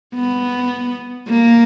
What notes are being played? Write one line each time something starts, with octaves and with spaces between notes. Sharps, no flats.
B3
A#3